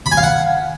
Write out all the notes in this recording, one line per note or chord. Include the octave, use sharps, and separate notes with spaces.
B5
G#5
F5
F#5